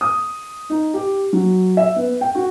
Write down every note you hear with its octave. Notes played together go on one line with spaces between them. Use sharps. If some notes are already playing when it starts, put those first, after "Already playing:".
D#6
D#4
G4
F#3
E5
B3
G5
F#4